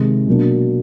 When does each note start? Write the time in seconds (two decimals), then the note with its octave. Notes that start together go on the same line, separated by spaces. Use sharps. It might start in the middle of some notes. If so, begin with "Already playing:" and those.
Already playing: C3 D#3 G#3
0.27 B2 F#3 A#3 D4